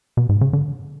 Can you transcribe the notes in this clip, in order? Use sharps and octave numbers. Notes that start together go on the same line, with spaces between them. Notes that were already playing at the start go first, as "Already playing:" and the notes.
B2
G#2
C#3
D3